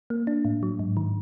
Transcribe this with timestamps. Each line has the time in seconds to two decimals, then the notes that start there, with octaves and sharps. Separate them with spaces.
0.10 A#3
0.27 D4
0.45 A2
0.63 F#3
0.79 G#2
0.97 D#3